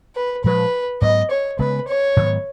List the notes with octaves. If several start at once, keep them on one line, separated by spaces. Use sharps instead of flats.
B4
A#2 F3 G#3 B4
G#2 F#3 B3 D#5
C#5
C#3 G#3 B3 B4
C#5
G#2 D#3 F#3 B3